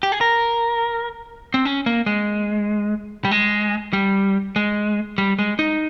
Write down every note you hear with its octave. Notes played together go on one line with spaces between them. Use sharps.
G4
G#4
A#4
C4
C#4
A#3
G#3
G3
G#3
G3
G#3
G3
G#3
D#4